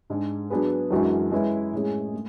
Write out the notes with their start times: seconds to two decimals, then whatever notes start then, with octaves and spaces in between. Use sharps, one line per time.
0.10 G#2 G#3 D4 G#4
0.50 F#3 B3 D4 G#4 B4
0.91 F#2 E3 G#3 D4 F#4
1.32 G#3 C#4 E4 B4
1.73 A2 G#3 C#4 G#4
2.14 A3